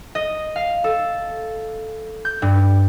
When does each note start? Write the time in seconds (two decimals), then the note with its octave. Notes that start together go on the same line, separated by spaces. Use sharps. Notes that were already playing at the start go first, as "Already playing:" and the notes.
0.15 D#5
0.56 F5
0.84 A4
2.25 G6
2.42 G2